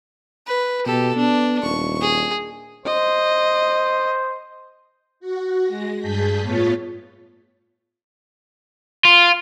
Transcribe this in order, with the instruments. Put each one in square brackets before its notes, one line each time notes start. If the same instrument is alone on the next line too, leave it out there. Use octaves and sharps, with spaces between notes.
[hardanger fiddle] B4
[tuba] B2 [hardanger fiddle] G4 A4
[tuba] B3 [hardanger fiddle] D4
[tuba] D#1 [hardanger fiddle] C#6
[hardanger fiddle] G#4
[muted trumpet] C5 [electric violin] D#5
[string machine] F#4
G#3 A#6
G2 G#4 A5 G6 B6
A2 B3 F4 C#5 A6 B6
[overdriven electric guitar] F4